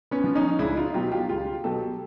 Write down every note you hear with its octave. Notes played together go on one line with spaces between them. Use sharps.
B3 C#4
F3
C#4 D#4
C#2 D4 E4
D#4 F4
B2 F#3 F4 G4
F4 G4
C#2 F4 G4
B2 F#3 G4 A4